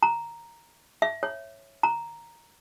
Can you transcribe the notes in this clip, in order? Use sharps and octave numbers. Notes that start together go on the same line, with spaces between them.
A#5
E5
C#5
A#5